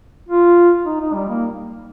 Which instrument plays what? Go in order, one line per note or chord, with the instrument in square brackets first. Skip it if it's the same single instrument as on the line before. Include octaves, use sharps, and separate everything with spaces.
[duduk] F4
D#4
D#4
G3
A#3